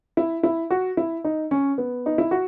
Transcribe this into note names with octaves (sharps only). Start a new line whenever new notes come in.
E4
E4
F#4
E4
D#4
C#4
B3
D#4
E4
F#4